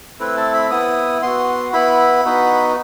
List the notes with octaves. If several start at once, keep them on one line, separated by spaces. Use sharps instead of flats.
A3 C4 E4 B4
A5
B5
B3 E4 D#6
B3 F#4 C6
B3 E4 B5
B3 D#4 F#4